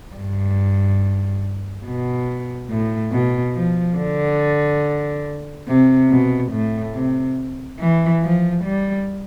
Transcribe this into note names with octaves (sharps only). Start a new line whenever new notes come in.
G2
B2
A2
B2
F3
D3
C3
B2
A2
C3
E3
F3
G3